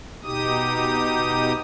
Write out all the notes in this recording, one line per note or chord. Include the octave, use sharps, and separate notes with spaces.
B2 D#4 G4 D#6